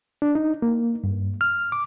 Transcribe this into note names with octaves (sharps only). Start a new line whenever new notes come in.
D4
D#4
A#3
G2
F6
D6